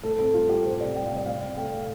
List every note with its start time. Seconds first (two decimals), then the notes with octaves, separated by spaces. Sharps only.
0.03 A2 A4
0.19 C4 A4
0.34 G3 F4
0.49 A2 G4
0.65 C3 C5
0.80 C4 D5
0.96 G3 G5
1.06 F5
1.11 C3
1.16 D5
1.26 A2 F5
1.42 C4
1.57 A3 G5
1.73 A2